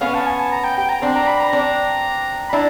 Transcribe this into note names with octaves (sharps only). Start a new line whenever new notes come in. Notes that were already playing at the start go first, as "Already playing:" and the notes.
B3 C#4 F5
A5
G#5
A5
A#5
G5
G5
A#5
C4 D4
A#5
B5
A#5
C4 D4
B5
D4 E4 A#5